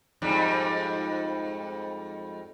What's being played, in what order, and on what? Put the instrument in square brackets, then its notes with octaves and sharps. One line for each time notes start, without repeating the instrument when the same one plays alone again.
[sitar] F2 G#2 G3